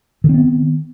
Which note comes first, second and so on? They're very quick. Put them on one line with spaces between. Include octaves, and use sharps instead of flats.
D#3 C4 B3